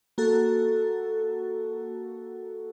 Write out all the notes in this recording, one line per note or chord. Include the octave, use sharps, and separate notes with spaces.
A#3 F#4 A4